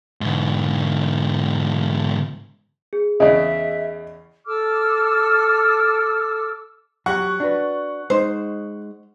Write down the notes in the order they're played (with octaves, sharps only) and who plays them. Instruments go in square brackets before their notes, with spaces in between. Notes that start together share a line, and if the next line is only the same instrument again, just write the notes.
[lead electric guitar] G#2 D3
[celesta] G#4
[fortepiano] E2 C#3 [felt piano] D#5 [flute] E5
[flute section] A4 D6 E6 F6
[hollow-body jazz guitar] F#3 F#4 G4 [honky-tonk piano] F#5 C#6
[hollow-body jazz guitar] D4 F#4 B4
[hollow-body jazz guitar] G#3 D#4 [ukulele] C5